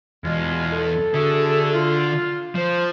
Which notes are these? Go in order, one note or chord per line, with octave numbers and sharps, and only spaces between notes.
E2 B2 G#3 F4
A4
D3 F#4 G#4 E5
F4
F3 C5